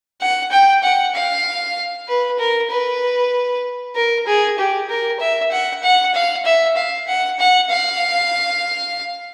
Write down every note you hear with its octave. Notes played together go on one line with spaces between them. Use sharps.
F#5
G5
F#5
F5
B4
A#4
B4
A#4
G#4
G4
A#4
E5
F#5
F#5
F5
E5
F5
F#5
F#5
F5